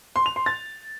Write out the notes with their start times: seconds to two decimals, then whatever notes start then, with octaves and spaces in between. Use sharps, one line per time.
0.16 C6
0.26 F7
0.36 C6
0.46 A6